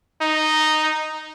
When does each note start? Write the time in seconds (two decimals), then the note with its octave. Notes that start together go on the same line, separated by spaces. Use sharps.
0.21 D#4